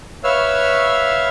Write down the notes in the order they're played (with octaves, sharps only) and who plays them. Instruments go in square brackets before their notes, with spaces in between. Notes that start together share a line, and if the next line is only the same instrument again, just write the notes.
[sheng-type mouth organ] B4 C#5 E5 F5 E6 F6